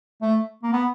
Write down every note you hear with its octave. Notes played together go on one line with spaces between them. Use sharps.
A3
A#3
B3